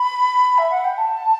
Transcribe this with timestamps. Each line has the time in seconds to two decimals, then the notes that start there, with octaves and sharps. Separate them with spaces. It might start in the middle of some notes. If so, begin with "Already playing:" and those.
Already playing: B5
0.58 E5
0.70 F#5
0.84 G5
0.97 A5